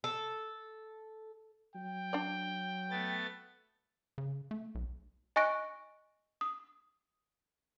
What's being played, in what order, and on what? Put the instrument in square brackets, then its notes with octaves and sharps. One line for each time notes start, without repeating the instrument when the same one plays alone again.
[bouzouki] A4
[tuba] F#3 [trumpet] G5
[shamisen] D4 D5
[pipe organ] A3 B3 A6
[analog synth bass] C#3
A3
B1
[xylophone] D#5 G#5 C#6 F#6 A#6 D7
D#6